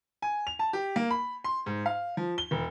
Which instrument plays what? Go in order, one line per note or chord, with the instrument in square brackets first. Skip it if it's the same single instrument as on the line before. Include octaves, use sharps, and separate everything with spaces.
[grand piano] G#5
F7
A5
G4
A#3
B5
C6
G#2
F5
F3
G7
E1